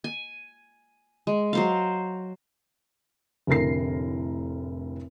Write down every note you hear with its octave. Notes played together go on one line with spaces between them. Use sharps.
G#5
G#3
F#3 C5 F5
F1 A2 D3 A#4 A#6 C7